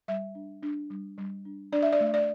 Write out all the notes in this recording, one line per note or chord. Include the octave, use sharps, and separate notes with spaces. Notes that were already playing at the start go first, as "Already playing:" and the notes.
G3 E5
D4
D4
G3
G3
D4
D4 D5
E5
D5
A3
D5